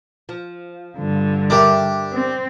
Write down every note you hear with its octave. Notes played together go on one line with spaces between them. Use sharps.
F3
G2 D3
G3 D4 G4 A#4 E5
C4